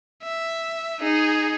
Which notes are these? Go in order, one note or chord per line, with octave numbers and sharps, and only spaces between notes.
E5
D#4 G#4